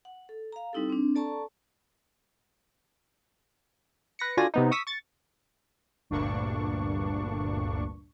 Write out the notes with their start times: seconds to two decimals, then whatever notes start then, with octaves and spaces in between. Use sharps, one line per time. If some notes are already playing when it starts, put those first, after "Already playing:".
0.05 F#5
0.29 A4
0.52 F5 A#5
0.73 G3 C4 D#4 E4 G4 A4
0.90 C4 D4
1.15 A4 D5 A5 A#5 C#6
4.19 B4 A#6 C#7
4.37 D3 F4 F#4 D5 G#5 A#6
4.54 C3 B3 D#4
4.71 C#6 D#6 E6 B6
4.87 C#6 A6
6.10 G1 D2 G2 A#2 D4 C#6